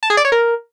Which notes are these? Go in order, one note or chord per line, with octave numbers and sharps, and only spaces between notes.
A5
G#4
D5
C#5
A#4